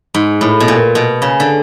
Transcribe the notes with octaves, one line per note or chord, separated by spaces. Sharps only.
G#2
A2
B2
A#2
B2
C#3
D3